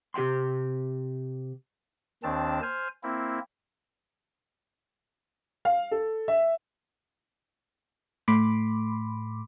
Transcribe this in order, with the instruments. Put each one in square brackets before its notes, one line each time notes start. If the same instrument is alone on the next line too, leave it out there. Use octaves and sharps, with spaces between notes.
[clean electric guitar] C3 G4 E5 G5 C6
[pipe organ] D#2 D#3 C4 D4 A5
C5 G#5 F6
A#3 C4 E4
[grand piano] F5
A4
E5
[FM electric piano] A2 A3 B5 C6 D6